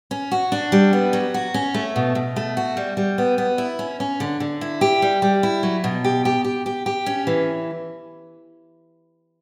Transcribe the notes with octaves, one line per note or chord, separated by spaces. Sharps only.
C#4
F#4
D4
G3
B3
F#3
F#4
C#4
A3
B2
B2
A3
F#4
G3
G3
B3
B3
E4
C#4
C#4
D3
D3
E4
G4
G3
G3
E4
F#3
B2
G4
G4
G4
G4
G4
C#4
E3